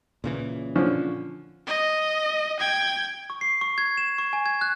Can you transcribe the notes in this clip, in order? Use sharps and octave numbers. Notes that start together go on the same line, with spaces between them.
A#2 C#3 E3
D3 F3 C#4
D#5
G5 G#6
C#6
C7
C#6
G#6
E7
C#6
G#5
G#6
F#6